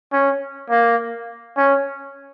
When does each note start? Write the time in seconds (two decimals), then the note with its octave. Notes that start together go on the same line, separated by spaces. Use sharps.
0.13 C#4
0.70 A#3
1.57 C#4